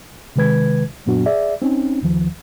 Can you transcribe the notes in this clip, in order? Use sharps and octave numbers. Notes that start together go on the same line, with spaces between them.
C3 D#3 G#3 B4 G#6
F#2 A#2 F#3 B3 D4 F#4
G#4 D5 E5
C4 C#4 D#4
D#2 D#3 F3